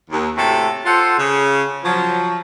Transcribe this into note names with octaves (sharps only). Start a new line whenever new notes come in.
D#2
A2 C3 F#4 A4
F4 A4 C5 F#5
C#3
F3 F#3